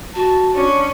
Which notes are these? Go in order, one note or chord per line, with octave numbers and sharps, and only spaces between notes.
F#4 A5
C#4 D4